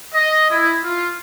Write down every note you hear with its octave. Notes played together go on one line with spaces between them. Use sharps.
D#5
E4
F4